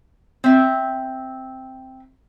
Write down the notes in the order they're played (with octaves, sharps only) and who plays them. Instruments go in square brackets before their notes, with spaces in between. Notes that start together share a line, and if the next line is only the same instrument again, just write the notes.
[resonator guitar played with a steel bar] C4 E5